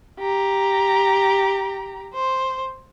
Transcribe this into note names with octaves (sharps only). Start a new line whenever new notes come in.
G4 A#5
C5